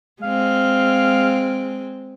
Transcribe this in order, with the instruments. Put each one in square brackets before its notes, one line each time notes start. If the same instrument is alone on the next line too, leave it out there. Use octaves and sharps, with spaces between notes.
[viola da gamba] G#3 C4 [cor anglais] F5